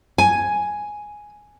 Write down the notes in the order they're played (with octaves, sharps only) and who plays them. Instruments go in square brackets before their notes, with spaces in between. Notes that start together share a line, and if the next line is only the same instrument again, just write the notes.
[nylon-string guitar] G#5